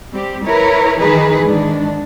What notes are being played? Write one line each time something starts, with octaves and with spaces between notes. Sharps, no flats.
G3 C4 G4
E4 A#4 B4 C#5
D#3 E3 D#4 G#4 B4
G#2 D#3 D4